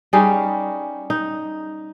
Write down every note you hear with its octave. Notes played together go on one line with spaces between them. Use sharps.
G3 C#4 D#4 G#4
D#4